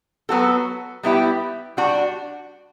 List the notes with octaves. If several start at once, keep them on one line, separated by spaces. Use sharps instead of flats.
F#3 B3 F#4 A4
G3 B3 E4 G4
G3 D4 F#4